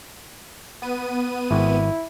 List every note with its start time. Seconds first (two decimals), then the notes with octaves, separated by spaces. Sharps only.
0.82 B3 D#7
1.51 G#1 E4